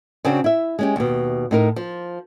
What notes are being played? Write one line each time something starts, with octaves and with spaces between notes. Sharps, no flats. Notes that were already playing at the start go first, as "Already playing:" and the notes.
C#3 C4 D4 F#4
E4 E5
G#3 C#4 G4
D#2 B2
A2 D#4 A#4
F3